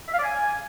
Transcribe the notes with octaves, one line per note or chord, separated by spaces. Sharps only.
E5
F5
D5
G#5